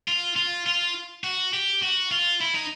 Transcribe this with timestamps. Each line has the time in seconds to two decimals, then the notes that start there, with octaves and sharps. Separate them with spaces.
0.08 F4
0.36 F4
0.66 F4
1.24 F#4
1.53 G4
1.82 F#4
2.11 F4
2.41 E4
2.54 D#4